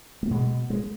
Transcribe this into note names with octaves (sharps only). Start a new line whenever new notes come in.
A3
B2 G#3
G#3